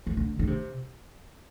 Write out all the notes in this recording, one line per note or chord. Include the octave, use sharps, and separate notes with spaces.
D#3
D3
D3
C3